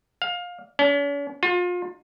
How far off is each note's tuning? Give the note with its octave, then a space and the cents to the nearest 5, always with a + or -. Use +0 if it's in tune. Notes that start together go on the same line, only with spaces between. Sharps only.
F5 +20
C#4 +45
F4 +30